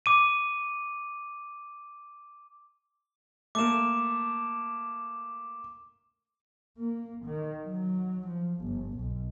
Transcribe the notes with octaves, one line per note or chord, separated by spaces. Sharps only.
D6 D#7
A3 A#3 D6 E7
A#3
D#3
F#3
F3
G1
B1